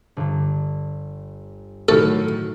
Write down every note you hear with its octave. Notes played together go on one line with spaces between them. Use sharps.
G1 D3
A2 D#3 F#3 A4 C#6 F6